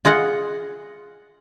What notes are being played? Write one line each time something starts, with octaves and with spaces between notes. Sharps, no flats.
F4 G#4 D#5 F#5